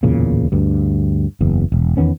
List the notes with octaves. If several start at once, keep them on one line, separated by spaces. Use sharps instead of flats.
D1 E2 A#2 C#3
D2 G2
F#1 E2
E1
E2 D#3 B3 C#4